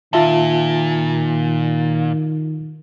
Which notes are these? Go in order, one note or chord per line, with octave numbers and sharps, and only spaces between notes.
A#2 D#3 F4 E5 A5